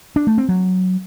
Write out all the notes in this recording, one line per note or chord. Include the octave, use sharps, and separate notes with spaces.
D4
A3
C4
F#3